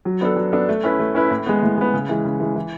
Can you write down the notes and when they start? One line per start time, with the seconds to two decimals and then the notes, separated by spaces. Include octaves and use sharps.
0.05 F#3
0.21 B3 D4 A4
0.36 F#3
0.52 B3 D4 A4
0.69 A3
0.84 C#4 E4 B4
1.00 A3
1.15 C#4 E4 B4
1.31 A2
1.46 G#3 B3
1.63 A2
1.78 G#3 B3
1.94 C#3
2.09 E3 G#3
2.25 C#3
2.40 E3 G#3
2.55 E3